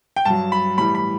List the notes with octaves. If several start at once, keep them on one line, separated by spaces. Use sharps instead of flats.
G5
G2 F#3 A5
B5
A2 E3 G3 B5
B5